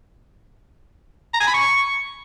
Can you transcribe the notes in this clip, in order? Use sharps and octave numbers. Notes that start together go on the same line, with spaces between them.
A#5
G#5
B5
C#6